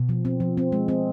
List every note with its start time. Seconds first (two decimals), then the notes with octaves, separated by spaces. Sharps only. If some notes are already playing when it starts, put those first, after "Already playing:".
Already playing: B2
0.09 F3
0.25 C4
0.40 F3
0.57 C4
0.72 G#3
0.88 C4